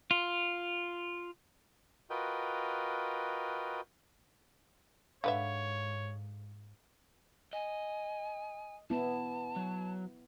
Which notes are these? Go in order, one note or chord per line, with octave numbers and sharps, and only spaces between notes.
F4
F4 F#4 A#4 B4 D#5 G5
G#2 D3 B4 C#5 E5 F5
D#5 G#5
B3 E4 A5
F#3